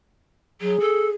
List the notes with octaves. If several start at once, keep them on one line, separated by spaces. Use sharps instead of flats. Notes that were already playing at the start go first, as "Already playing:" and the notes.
F#3 G#4
A4